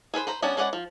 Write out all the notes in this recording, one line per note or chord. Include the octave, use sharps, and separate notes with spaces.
G#4 A4 B4 C5
B4 C5 A#5
G3 B3 C#4 D4 A5
G#3 C#4 B4 D5 F#5
F3